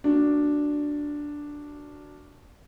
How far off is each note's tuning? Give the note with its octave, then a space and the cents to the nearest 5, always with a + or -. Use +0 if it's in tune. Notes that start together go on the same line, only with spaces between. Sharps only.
A#3 +0 D4 +0 F#4 +0